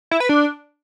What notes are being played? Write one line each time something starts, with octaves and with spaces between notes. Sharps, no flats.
E4
B4
D4